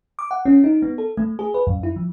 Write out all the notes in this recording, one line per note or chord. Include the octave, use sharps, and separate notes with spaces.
D6
F#5
C#4
D#4
B3
A4
A3
G#4
B4
F#2
E4
F3